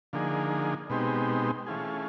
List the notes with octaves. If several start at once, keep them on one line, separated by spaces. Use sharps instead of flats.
D3 F3 A#3 D#4 G#4
B2 G#3 C4 D#4 G4
E3 A3 C#4 F4 G#4